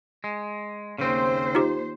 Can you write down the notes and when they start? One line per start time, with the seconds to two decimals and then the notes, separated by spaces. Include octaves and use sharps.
0.24 G#3
0.98 D#2 C#3 C4 C5
1.55 D#4 F4 G4